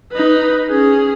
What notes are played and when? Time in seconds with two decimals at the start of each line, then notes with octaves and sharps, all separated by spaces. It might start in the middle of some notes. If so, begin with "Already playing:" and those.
0.12 D#4 B4
0.69 C#4 G#4